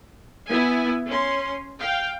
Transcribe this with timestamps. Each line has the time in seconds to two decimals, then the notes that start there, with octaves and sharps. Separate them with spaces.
0.48 B3 E4 G#5
1.07 C#4 C6
1.79 F5 G5